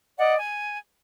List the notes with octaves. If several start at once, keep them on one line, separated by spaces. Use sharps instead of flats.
D5 D#5 F#5
G#5